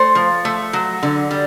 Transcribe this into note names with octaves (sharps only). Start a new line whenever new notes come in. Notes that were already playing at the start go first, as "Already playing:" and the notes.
Already playing: A3 C5
F3
A3
F#3
D3
G3